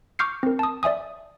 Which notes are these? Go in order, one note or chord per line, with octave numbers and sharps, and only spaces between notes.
C#6 D6 F6 G6 C7 C#7
C4 A#4
A5 D#6
D5 E5 G#5 D#6